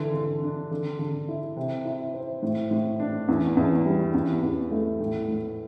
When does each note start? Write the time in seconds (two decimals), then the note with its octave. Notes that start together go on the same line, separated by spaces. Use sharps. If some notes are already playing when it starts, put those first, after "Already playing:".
Already playing: D3 E3
0.14 D3
0.42 D4
0.71 D3
0.99 D3
1.28 E4
1.57 C3
1.85 E4
2.13 C4
2.42 A2
2.71 A2
3.00 D4
3.28 E2
3.57 E2
3.86 G3
4.14 E2
4.43 E2
4.71 A3
5.00 A2
5.28 A2